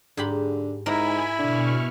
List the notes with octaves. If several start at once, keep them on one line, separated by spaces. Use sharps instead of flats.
G#2 D3 G4 B5
G#2 E4 A#4 G#5 B5
B2 D3 C#6 F6